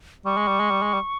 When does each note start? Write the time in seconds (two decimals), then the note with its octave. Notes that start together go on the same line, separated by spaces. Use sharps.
0.25 G3 C#6
0.37 G#3
0.48 G3
0.60 G#3
0.71 G3
0.82 G#3
0.94 G3